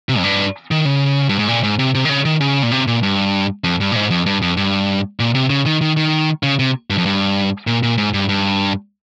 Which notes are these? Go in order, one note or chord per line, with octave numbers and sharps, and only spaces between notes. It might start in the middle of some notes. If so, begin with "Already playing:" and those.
C3
F2
G2
D#3
C#3
G2
G#2
A#2
G#2
C3
C3
D#3
C#3
D#3
C#3
A#2
C3
A#2
G2
F2
G2
A#2
G#2
F2
G2
F2
G2
A#2
C3
C#3
D#3
D#3
D#3
C#3
C3
G2
F2
G2
A#2
A#2
G#2
G2
G2